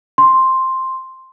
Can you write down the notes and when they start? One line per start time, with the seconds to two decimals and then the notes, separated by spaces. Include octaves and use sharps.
0.18 C6